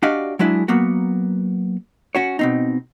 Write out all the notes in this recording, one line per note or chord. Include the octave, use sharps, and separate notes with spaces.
D4 F#4 G4 D5 D#5 F5
F#3 G#3 D4 E4 G#4
F#3 A#3 B3 F#4
C#4 F#4 C#5
B2 C4 D#4